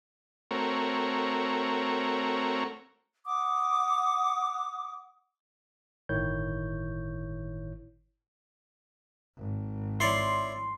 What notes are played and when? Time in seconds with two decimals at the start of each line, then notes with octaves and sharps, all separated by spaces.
0.51 A3 C4 F#4 A#4 C#5
3.25 F#5 D6 D#6
6.09 G1 A2 D#3 E4 C#5 G6
9.37 G#1
10.00 E4 C#5 D5 C6